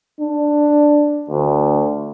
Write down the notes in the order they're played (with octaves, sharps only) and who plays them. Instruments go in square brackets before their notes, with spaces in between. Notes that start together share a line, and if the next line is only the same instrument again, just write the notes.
[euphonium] D4
D2